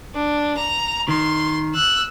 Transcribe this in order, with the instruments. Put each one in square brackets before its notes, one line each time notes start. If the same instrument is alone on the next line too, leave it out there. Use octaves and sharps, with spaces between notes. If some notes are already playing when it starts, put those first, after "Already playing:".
[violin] D4
A#5
[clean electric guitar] D#3 [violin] C6
[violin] E6 F#6